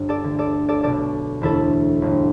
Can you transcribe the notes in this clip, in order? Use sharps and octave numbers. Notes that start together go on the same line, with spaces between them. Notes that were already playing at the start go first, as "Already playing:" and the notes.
Already playing: G1 G2
A4 D5
D2 D3
A4 D5
A4 D5
B1 B2 A4 D5
E1 D2 D3 E4 A4
G1 G2 D3